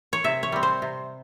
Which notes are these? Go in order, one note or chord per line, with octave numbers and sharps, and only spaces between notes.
C#5
C3 E5
C#5
G3 C4
C5
C3